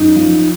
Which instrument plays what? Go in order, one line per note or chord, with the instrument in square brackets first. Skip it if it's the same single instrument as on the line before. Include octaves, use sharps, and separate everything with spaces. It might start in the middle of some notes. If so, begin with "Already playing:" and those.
Already playing: [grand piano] F#2 [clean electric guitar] D#4
[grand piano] F3